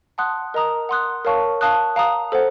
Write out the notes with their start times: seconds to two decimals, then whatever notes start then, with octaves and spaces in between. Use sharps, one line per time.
0.18 F#5 A5 C6 D#6 F#6
0.54 A#4 D#5 A#5 D#6
0.89 F#5 C6 D#6 F#6
1.25 A#4 C#5 F5 A5 C#6
1.61 F5 A5 D#6 F#6
1.96 F5 A#5 D#6
2.32 A4 C5 F#5